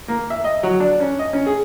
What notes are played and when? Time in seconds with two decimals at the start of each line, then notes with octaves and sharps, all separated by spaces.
0.08 A#3
0.30 E5
0.44 D#5
0.63 F#3
0.80 D4
1.00 C#4
1.19 D#5
1.33 C#4
1.46 G#4